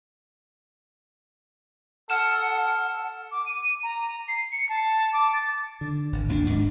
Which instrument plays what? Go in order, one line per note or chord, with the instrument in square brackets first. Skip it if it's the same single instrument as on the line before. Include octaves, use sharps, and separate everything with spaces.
[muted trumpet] A4 [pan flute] F#5 [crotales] F6 E7
[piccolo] D6
D#7
A#5
C7
C#7
A5
D6
A6
[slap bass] D3
G#1
G#1 D#2 C4 D4
D#1 G#2 G3 D4